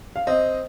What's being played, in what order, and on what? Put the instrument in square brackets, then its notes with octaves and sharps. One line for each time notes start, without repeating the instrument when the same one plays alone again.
[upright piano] F5
[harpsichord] C4 [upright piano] D#5